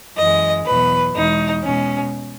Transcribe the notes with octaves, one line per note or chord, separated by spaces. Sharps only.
F#2 E3 G#3 D#5
E2 B2 F#3 B4
E2 B2 G#3 D#4
B2 G#3 C#4